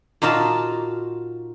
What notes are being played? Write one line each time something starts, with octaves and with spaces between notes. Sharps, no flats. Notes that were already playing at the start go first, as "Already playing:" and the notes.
A#2 D#4 F4 F#4 A5